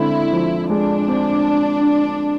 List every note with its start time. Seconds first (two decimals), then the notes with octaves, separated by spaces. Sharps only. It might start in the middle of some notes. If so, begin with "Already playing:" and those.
Already playing: D3 G#3 C4 E4
0.32 F3
0.70 G#3 D4
1.08 C4